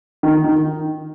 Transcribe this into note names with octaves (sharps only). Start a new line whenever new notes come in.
D#3
D#3